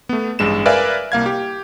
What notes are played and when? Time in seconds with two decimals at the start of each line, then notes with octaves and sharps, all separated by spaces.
0.09 A3 B3
0.39 A1 G2 G#3 E7
0.65 A#4 B4 D5 E5 F5 G#5
1.12 C2 A#3 F5 G#6
1.26 G4